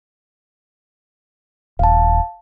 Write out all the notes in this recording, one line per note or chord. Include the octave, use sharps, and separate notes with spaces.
D#1 F5 A5